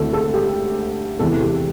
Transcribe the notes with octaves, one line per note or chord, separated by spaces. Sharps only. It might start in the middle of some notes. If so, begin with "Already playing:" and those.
Already playing: D2 D3 A3 C4 E4 A4
A4
G4
E2 C3 E3 A4
G4